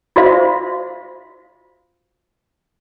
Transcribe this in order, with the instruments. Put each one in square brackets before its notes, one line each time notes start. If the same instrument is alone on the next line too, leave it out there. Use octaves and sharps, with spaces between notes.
[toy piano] F4 F#4 C5 E5 F5